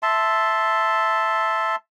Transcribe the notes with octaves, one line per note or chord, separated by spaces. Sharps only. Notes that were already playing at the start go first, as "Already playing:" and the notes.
E5 A5 C6